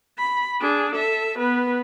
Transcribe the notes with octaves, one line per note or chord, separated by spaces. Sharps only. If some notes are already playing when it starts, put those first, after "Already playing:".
B5
D4 G#4
A4 E5
B3 B4